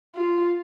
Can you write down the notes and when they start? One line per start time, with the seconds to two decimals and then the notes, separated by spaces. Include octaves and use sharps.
0.15 F4